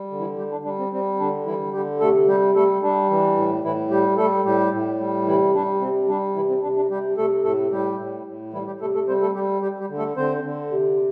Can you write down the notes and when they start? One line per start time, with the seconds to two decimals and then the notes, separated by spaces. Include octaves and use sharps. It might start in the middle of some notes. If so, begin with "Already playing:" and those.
Already playing: G3
0.11 D3
0.19 E3 E4
0.38 G3 G4
0.52 D4
0.65 G3 D4
0.79 C4
0.92 G3 C4
1.19 D3 D4
1.46 E3 G3 E4
1.73 D3 G3 G4
2.00 C3 A3 A4
2.28 G3 G4
2.55 G3 A3 A4
2.82 G3 D4
3.10 E3
3.37 A2
3.64 A2 E3 E4
3.90 G3 G4
4.18 G3 A3 A4
4.45 A2 G3 G4
4.72 A2
5.00 G3
5.27 C3 E3 E4
5.54 G3 D4
5.81 C3 C4
6.08 G3 D4
6.36 C3 E3 E4
6.49 C4
6.63 C3 D4
6.76 D4
6.90 C3 G3 G4
7.17 C3 A3 A4
7.44 A2 A3 A4
7.71 A2 G3 G4
7.98 A2
8.27 A2
8.53 E3 G3 E4
8.66 G3 G4
8.80 C3 A3 A4
8.94 A3 A4
9.07 G3 C4 C5
9.22 A3 A4
9.35 G3 G4
9.62 G3 G4
9.80 G3 G4
9.89 D3
9.98 A3 A4
10.17 D3 C4 C5
10.44 D3
10.71 C3